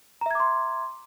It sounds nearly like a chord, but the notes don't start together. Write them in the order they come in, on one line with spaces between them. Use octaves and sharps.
A#5 E5 G#6 D6 C6